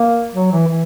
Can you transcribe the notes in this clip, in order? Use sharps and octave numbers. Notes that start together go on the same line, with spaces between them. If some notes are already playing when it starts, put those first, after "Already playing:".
Already playing: A#3
F#3
E3
E3